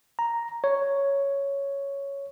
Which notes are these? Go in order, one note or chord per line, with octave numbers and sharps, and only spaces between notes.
A#5
C#5